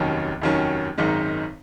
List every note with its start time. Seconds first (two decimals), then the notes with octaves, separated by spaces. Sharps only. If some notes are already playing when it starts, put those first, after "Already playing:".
Already playing: F1 D#2 D#3 F#3 C#4
0.42 F1 D#2 D#3 F#3 C#4
0.98 G#1 F#2 D#3 G#3 D#4